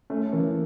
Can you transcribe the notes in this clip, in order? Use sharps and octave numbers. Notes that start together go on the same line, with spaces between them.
A3 C#4
E3 A#3